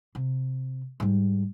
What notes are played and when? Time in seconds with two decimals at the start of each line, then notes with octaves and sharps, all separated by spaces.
0.15 C3
1.00 G#2 G3